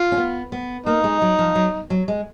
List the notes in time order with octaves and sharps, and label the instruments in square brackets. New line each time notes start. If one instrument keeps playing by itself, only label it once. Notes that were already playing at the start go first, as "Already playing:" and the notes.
Already playing: [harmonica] F4
[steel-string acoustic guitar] C#4
B3
B3
[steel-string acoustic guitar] A#3 [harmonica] D#4
[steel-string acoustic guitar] G#3
F#3
F3
F#3
F#3
G#3